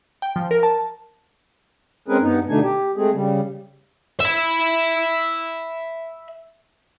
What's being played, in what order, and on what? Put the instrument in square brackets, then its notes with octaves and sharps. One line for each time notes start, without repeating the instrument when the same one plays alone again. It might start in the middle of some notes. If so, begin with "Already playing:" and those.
[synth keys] G5
F3
A#4
A5
[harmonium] G#3 C4 C#4 G#4 A#4 B4
G2 B3 D#4
B2 D3 A3 D4 D#4 G#5
G4
G#3 A3 C4 G#4
C#3 G3
[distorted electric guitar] E5 B5